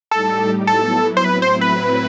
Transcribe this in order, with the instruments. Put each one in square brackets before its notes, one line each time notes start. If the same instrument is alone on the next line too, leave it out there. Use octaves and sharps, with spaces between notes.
[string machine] A2 G3 D#4 G4 [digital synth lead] A4
[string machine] F#3 B3 E4 [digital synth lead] A4
[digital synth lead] C5
[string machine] A2 F#3 C4 E4 [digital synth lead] B4
[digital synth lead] C5
B4